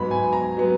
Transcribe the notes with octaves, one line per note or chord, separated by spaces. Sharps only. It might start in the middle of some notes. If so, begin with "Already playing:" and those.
Already playing: G#2 F#3 B3 B5
G#5
A#5
F#3 B3